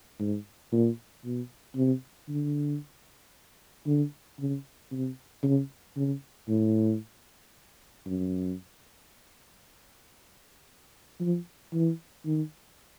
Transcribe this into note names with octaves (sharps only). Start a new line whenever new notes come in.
G#2
A#2
B2
C3
D3
D3
C#3
C3
C#3
C#3
A2
F#2
F3
E3
D#3